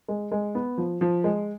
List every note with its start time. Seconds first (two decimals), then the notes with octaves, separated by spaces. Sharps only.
0.08 G#3
0.32 G#3
0.55 B3
0.78 F3
1.01 F3
1.24 G#3